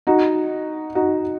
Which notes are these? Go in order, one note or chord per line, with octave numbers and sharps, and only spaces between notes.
D#4 F#4
D#4 F#4